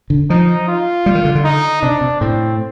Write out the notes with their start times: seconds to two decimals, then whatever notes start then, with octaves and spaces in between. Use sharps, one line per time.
0.10 D3
0.30 F3 D#4
0.68 F4
1.06 G3
1.15 D#3
1.25 D3
1.35 D3
1.44 D#4
1.82 C3 D4
2.01 C3
2.20 A2 C4